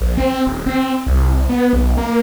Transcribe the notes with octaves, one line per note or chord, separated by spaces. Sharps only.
A#1
C4
D#1
C4
C2
B3
B1
A#3